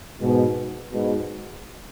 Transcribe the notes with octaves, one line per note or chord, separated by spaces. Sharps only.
G#2 B2
G#2 B2